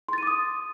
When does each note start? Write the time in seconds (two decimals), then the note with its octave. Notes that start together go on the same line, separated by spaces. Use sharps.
0.09 C6
0.13 A6
0.18 D#7
0.23 D6
0.27 D#6